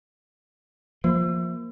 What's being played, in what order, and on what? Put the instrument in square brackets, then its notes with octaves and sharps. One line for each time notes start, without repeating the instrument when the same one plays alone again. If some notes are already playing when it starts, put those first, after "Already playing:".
[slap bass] F3 [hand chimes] A#3